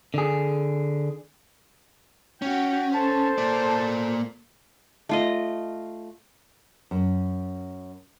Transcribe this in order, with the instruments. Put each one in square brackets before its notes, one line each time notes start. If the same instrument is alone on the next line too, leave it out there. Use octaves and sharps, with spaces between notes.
[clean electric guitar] D3 G#4
[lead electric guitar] C#4 [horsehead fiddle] F#4 G5
[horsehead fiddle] A4 C5 [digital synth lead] A5
[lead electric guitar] A#3 D5
[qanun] A3 F4 D#5
[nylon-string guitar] F#2